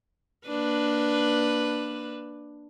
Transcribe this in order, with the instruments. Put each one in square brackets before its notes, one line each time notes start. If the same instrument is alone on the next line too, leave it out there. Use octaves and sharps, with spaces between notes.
[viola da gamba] A#3 D4 B4